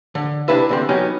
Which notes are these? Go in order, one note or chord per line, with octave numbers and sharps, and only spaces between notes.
D3
C3 D4 E4 B4 E5
E2 D3 C4
F#3 B3 C#4 D#4 G4